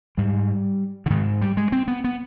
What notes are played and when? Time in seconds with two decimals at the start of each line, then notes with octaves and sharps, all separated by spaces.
0.17 G#2 G3
1.06 D3
1.10 G#2 D#3
1.42 G3
1.57 G#3
1.72 C4
1.88 B3
2.04 B3